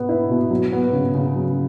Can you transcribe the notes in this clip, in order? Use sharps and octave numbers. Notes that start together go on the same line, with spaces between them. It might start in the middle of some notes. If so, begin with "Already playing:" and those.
Already playing: B2 B3
E4
B2
F#3
B3
C#3
C#3
F#3